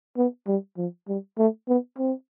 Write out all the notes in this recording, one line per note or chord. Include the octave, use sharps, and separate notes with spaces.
B3
G3
F3
G3
A3
B3
C4